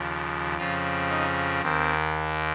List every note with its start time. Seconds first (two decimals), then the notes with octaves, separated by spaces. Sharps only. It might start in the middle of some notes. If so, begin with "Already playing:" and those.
Already playing: D#2 C#3 F3
0.57 F2 C#3 F3 F4
1.10 D#4
1.62 D#2 D#3 C4